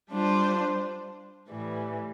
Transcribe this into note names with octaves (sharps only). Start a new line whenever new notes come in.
G3 D4 F4 C5
A2 E3 G3